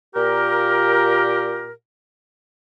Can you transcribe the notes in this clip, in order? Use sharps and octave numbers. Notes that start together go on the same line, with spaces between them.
A#2 G4 A#4